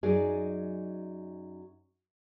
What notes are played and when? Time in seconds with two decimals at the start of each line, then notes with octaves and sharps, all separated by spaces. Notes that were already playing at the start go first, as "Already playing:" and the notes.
0.03 F#2 F#3 D#4 G#4 D5